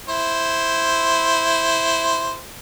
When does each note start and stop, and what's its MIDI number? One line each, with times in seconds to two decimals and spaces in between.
0.09 2.40 64
0.09 2.40 72